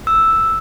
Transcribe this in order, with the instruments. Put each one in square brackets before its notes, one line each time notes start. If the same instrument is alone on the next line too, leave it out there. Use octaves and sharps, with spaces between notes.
[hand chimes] E6